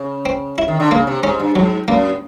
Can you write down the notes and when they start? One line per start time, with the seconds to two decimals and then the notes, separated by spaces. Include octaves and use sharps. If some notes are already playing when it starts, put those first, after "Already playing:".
Already playing: C#3
0.26 C4
0.58 E4
0.68 D#3
0.80 D3
0.91 C#3 A#3
1.07 C3
1.23 G#2 C#4
1.40 G2
1.55 G#2 F#3
1.88 F#2 A#3